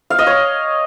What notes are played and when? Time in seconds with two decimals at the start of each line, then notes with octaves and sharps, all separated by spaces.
0.10 F5
0.19 D#5
0.27 C#5